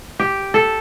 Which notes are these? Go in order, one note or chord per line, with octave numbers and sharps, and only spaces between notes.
G4
A4